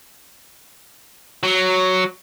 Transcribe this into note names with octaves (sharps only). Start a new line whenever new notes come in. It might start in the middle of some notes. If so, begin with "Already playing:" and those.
F#3